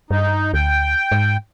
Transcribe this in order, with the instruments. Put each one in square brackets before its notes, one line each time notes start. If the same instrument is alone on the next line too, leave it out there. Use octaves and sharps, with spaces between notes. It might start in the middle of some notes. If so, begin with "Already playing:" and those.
[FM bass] G2 [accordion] D#4
[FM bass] D2 [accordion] G5
[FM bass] G#2